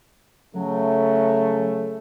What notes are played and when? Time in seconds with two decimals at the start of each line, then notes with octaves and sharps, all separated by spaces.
0.55 C#3 F#3 A3